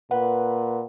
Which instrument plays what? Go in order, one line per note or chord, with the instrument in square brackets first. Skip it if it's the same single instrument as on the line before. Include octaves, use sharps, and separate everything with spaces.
[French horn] A#2 [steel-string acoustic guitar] B4 [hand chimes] F#5